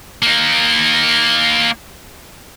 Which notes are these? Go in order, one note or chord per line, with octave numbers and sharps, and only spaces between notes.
A#3 D#4